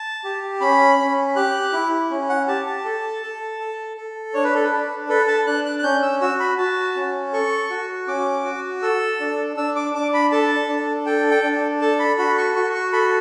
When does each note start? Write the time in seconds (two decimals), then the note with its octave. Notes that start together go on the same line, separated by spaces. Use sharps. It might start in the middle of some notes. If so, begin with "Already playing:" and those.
Already playing: A5
0.24 G4
0.61 C#4 B5
0.99 C#4
1.36 G4 F#6
1.73 E4
2.11 C#4
2.29 F#5
2.48 G4 A5
2.67 A5
2.85 A4
3.23 A4
3.60 A4
3.97 A4
4.34 D4 C#5
4.44 B4
4.55 A4
4.64 B4
4.72 D4
5.09 A4 B4
5.28 A5
5.46 D4 F#6
5.66 F#6
5.79 F#6
5.83 C#4 G6
6.02 E6
6.21 F#4 E6
6.40 B5
6.58 F#4 A5
6.96 C#4
7.33 A4 C#6
7.70 F#4
8.08 C#4 D6
8.45 F#4
8.82 A4 E6
9.20 D4
9.57 D4 E6
9.76 D6
9.94 D4 D6
10.14 B5
10.32 A4 A5
10.69 D4
11.06 A4 G5
11.31 G5
11.43 D4
11.81 A4 A5
11.99 B5
12.18 F#4 B5
12.37 C#6
12.55 F#4 C#6
12.74 C#6
12.93 A4 B5